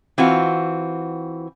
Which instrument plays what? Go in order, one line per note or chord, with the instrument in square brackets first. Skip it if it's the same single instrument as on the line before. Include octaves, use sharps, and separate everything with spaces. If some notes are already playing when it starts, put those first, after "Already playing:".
[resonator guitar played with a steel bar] E3 C4 F4 F#4